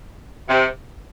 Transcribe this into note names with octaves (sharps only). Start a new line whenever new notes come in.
C3